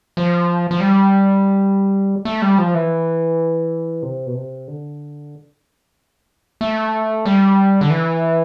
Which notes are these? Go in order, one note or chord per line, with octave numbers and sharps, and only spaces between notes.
F3
F3
G3
A3
G3
F3
E3
C3
B2
C3
D3
A3
G3
D3
E3